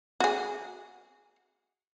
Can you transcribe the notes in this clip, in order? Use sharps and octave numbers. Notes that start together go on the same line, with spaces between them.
F#4 G#4